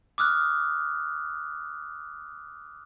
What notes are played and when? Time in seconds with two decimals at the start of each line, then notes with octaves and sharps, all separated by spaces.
0.18 D6 D#6 F6 F#6